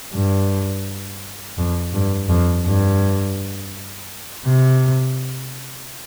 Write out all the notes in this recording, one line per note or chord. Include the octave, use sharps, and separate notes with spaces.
G2
F2
G2
F2
G2
C3